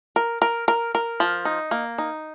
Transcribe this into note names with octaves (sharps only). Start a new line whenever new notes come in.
A#4
A#4
A#4
A#4
F3
D#4
A#3
D#4